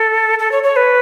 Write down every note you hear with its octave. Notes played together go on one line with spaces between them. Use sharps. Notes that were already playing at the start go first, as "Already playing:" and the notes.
Already playing: A4
A4
C#5
C#5
B4